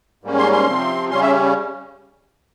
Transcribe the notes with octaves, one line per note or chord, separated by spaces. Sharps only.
G#2 G3 A#3 C#4
C6
C6
C3 F3 C4
C#3 G3 C#4 C6
E5